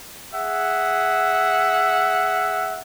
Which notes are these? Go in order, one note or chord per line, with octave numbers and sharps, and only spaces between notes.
G#4 E5 F#5